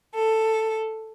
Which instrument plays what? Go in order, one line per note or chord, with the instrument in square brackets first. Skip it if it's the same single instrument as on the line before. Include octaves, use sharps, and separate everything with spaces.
[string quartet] A4